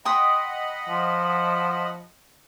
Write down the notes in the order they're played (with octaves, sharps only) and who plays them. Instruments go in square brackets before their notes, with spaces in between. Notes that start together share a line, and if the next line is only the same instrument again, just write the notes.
[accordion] D#5 F#5 B5 [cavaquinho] G5 C6 D#6
[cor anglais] F3